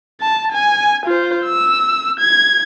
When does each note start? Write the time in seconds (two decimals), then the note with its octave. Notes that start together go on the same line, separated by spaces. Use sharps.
0.21 A5
0.52 G#5
1.06 F4 C5
1.46 E6
2.19 G#6